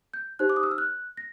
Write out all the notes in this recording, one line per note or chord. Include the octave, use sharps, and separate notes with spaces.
G6
D#4 G4 C5 F#6
D6
D#6
E6
F6
F#6
A#6